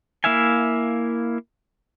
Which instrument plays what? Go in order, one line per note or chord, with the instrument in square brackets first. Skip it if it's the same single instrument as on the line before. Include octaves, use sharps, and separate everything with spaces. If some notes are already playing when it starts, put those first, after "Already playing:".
[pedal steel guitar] A#3 E4 E5 F5 G#5